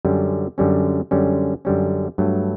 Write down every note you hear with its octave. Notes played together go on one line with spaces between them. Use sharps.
F#2 D3 G3 C#4
F#2 D3 G3 C#4
F#2 D3 G3 C#4
F#2 D3 G3 C#4
G2 F#3 A3